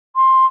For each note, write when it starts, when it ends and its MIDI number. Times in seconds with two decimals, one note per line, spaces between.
0.16 0.46 84